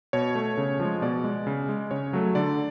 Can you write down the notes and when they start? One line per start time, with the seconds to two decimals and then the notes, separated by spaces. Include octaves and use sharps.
0.13 B2 C#5
0.35 A3
0.57 C#3
0.80 F3 G#3
1.02 B2 D5
1.24 G#3
1.47 C#3
1.69 G#3
1.91 C#3 C#5
2.13 F#3 A3
2.35 D3 D5